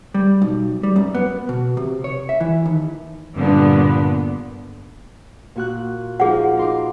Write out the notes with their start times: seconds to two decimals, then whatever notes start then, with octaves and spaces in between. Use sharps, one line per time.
0.14 G3
0.42 B1
0.83 G3
0.96 F#2
1.15 B3
1.49 B2
1.77 C3
2.04 C#5
2.29 E5
2.40 E3
2.65 D#2
3.35 G2 A#2 D3 B3
5.56 A#2 F#4 F#6
6.20 F3 D#4 F4 G#4 F#5
6.57 D#4 C6 D6